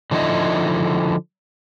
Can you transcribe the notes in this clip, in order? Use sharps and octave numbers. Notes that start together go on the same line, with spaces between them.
D3 F3 D#4 E4 D#5